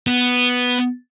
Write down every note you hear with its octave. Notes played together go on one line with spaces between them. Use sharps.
B3